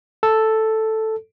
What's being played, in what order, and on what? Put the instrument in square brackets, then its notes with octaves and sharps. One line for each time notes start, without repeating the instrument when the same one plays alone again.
[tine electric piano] A4